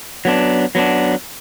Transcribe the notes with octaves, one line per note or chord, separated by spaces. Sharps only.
F#3 B3 D4
F#3 B3 D4